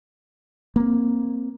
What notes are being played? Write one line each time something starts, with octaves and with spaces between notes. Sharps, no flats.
A#3 C4